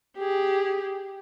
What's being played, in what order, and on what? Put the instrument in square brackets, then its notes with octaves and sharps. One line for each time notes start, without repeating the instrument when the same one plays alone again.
[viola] G4 G#4